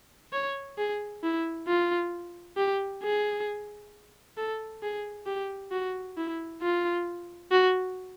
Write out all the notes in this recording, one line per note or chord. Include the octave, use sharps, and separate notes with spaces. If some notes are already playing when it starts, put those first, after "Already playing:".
C#5
G#4
E4
F4
G4
G#4
A4
G#4
G4
F#4
E4
F4
F#4